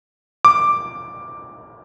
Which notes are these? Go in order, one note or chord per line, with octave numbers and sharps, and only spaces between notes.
D6